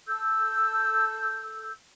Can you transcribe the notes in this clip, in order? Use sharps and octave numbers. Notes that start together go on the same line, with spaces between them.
A4 E6 G6